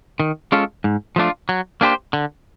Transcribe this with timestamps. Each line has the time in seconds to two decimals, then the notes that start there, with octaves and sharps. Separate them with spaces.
0.20 D#3
0.52 G#3 C#4 F4 A4
0.84 G#2
1.16 F3 A3 D4 F4
1.49 F#3
1.81 A#3 D4 G4 C5
2.13 D3